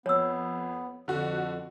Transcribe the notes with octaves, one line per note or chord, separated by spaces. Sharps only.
F2 B3 C#5 E6
F2 D3 F#4